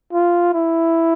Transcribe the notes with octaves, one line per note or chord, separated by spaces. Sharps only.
F4
E4